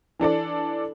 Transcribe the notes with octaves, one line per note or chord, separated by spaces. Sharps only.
E3 D4 A4 D5